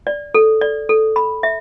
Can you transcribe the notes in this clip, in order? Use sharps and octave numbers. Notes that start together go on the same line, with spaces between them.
D5
A4
D5
A4
B5
E5